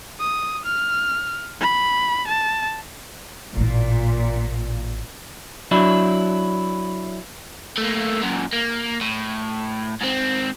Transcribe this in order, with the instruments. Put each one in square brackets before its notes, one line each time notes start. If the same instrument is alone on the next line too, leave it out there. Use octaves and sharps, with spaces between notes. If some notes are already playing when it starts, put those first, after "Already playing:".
[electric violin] D#6
F6
B5
A5
[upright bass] A1 E4 [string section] A#2
[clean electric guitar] F#3 D4 E4
[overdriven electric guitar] A3 A#3
F#2 A#2
A#3
A2
G#2 C4